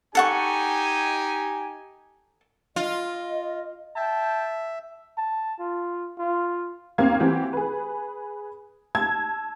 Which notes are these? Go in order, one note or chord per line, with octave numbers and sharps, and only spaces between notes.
D#4 G4 A4 F#5 G#5 C#6
F4 D#5
E5 G5 A5
A5
F4
F4
D#2 A#3 C4 F5 G#6
E3 C4 F#4 G4
G#4 B4
A5 E6 G#6